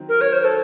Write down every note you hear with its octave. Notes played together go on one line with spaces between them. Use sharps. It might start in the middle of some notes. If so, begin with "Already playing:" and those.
Already playing: D#3 F#3 C4
A#4
C#5
C5
A4